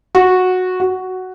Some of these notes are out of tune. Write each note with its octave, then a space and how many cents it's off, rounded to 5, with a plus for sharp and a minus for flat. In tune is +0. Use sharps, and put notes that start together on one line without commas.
F#4 -10
F#4 +5